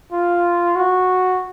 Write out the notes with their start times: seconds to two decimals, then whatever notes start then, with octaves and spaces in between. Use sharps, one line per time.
0.12 F4
0.76 F#4